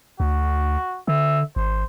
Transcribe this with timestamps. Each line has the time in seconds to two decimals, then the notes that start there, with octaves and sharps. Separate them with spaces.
0.20 D2 F#4
1.08 D3 E5
1.56 G#1 C5